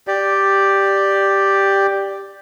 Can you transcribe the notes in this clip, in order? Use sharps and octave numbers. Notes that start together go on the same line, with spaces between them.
G4 D5